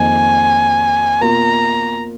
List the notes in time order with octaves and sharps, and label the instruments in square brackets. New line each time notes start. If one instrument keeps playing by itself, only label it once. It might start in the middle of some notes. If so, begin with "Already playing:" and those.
Already playing: [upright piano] F2 D#3 A#3 [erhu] G#5
[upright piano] B2 A#3 F4 A#4 [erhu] A#5